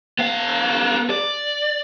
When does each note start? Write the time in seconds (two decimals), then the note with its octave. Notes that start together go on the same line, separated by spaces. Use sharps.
0.19 B3 F5
1.10 D5